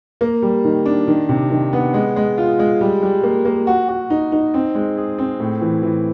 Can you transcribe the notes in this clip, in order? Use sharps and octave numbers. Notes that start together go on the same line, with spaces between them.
A#3
G3
D#3
D4
D#3
C3
D#3
B3
G#3
G#3
F4
G#3
G3
G3
A#3
A#3
F#4
F#4
D#4
D#4
C4
G#3
G#4
C4
A2
E3
E3